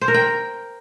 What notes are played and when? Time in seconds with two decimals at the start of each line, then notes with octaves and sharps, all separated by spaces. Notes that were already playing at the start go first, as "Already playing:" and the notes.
0.01 C5
0.08 A#4
0.14 G5